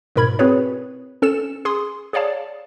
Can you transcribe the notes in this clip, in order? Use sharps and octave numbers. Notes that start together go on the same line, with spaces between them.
G#2 B2 A#4 B5 G#6
C4 E4 F#4 G#4 B4 C#5
C#4 A4 E6 E7
G#4 C6 D#6
G#4 C#5 D5 F5 A5